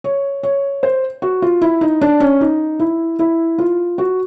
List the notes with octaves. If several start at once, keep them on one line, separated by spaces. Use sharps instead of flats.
C#5
C#5
C5
F#4
F4
E4
D#4
D4
C#4
D#4
E4
E4
F4
F#4